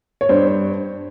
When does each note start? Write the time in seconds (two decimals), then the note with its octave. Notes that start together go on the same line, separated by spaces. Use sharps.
0.21 C#5
0.29 G2 C5